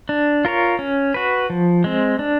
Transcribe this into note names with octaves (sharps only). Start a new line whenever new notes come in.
D4
F4 A#4 C#5
C#4
F#4 B4
F3
G#3 C4
D4